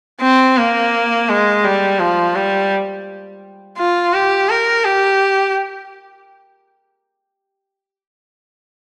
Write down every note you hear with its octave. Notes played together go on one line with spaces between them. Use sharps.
C4
A#3
G#3
G3
F3
G3
F4
G4
A#4
G4